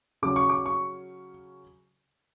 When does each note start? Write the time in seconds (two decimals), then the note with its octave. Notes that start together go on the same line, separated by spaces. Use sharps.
0.22 C#3 F#3 C#4 D6
0.36 C#6
0.49 D6
0.66 C#6